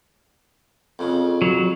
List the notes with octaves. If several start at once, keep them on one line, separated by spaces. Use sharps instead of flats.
F2 C#3
F#3